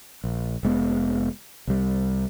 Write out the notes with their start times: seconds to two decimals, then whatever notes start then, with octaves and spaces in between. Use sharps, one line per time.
0.24 A#1
0.63 F1 G#3 B3
1.67 C2 G3